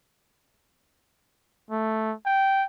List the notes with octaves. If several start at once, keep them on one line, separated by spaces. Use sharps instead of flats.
A3
G5